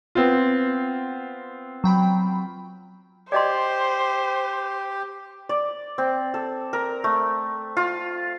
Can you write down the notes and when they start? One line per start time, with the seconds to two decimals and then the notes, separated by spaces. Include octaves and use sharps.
0.15 B3 C4 F4
1.84 F#3 G5 B5
3.32 G4 C5 D5 D#5 C6
5.49 D5
5.98 C4
6.34 A4
6.73 A#4
7.04 A3
7.77 F4